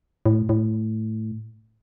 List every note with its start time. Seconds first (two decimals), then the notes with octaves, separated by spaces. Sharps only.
0.26 A2
0.49 A2